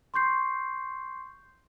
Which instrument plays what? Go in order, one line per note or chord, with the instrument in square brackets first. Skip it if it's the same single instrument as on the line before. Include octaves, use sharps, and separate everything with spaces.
[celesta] C6 C#6 G6 C7